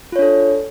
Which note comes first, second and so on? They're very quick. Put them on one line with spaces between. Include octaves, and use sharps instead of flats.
F4 C#5 D4 A4